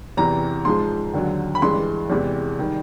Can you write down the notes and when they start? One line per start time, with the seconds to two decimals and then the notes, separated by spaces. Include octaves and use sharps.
0.17 E2 C3 E3 A#5
0.65 G#2 F3 G#3 C6
1.14 D#2 D3 F#3
1.55 B5
1.62 G2 E3 G#3 C6
2.10 E2 C3 E3 G#3
2.59 D#3 G3